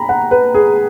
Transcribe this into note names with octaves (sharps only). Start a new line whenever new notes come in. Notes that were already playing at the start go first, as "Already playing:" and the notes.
Already playing: A#5 B5
F#5
B4
G#4